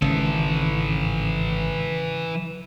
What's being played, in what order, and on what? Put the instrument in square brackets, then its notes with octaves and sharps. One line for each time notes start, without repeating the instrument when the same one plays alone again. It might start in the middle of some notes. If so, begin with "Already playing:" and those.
[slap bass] G#1 [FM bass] C#3 [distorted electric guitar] E3 A4